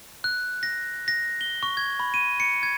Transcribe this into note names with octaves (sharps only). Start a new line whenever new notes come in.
F#6
A#6
A#6
G7
C#6
G#6
B5
D#7
C#7
G#6